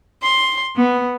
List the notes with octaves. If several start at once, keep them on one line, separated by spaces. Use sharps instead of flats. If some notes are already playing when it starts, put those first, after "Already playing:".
C6
B3